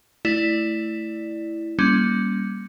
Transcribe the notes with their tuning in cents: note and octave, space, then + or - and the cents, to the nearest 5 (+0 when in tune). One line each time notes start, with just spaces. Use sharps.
A3 +0 E4 +0 D5 +5
G3 +0 A#3 +15 C#4 +0